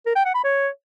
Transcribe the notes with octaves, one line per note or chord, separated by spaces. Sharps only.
A#4
G5
F#5
B5
C#5